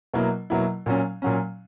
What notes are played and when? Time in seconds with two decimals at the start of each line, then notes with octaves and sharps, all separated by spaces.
0.14 B2 F#3 A#3 E4
0.50 B2 F#3 A#3 E4
0.86 A#2 F#3 C#4
1.22 A#2 F#3 C#4